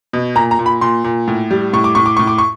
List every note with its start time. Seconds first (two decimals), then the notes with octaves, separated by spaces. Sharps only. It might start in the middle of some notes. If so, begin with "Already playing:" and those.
0.13 B2
0.35 A#2 A#5
0.51 A#5
0.59 A#2
0.66 B5
0.81 A#2 C6
1.04 A#2
1.28 A2
1.51 G3
1.73 A2 C#6
1.84 D6
1.95 A2 C#6
2.06 D6
2.17 A2 C#6
2.27 D6
2.38 C#6